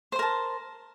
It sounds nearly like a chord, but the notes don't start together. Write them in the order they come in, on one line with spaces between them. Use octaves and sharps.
C5 C6 A#4 A5